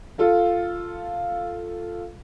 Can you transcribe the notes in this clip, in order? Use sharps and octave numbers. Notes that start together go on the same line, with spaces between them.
F4 A4 F5